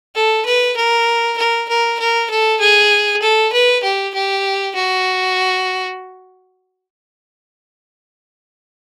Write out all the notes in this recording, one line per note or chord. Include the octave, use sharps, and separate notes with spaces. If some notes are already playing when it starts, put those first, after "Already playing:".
A4
B4
A#4
A#4
A#4
A#4
A4
G#4
A4
B4
G4
G4
F#4